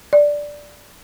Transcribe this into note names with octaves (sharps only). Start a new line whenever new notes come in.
D5